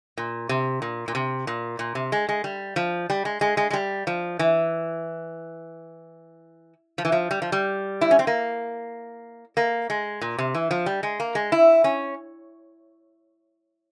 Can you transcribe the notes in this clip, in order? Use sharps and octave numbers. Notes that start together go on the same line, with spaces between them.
A#2
C3
A#2
A#2
C3
A#2
A#2
C3
G#3
G#3
G3
F3
G3
G#3
G#3
G#3
G#3
G3
F3
E3
F3
E3
F3
G3
F3
G3
E4
C#4
C4
A#3
A#3
G#3
A#2
C3
E3
F3
G3
G#3
A#3
G#3
E4
C#4